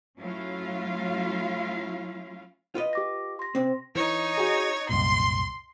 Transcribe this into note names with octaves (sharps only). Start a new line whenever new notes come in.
F#3 A3 C#4 E4 F4 F5
F4 B4 D#5
G4 D6 A#6
C6 A#6
C3 C4
E3 D#4 C#5
F#4 G#4
C2 F#2 A#2 C6